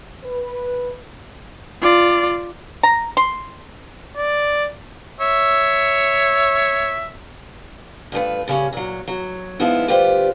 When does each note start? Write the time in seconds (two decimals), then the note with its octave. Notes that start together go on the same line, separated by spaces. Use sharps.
0.25 B4
1.82 F4 D5
2.83 A#5
3.17 C6
4.17 D5
5.20 C#5 E5
8.12 G2 F3 A3 B4
8.48 A2 C#3 G3 C#4
8.72 A#2 F#3
9.08 F#3
9.59 F3 G#3 B3 D#4 E4
9.88 D2 G3 F4 G4 B4 C5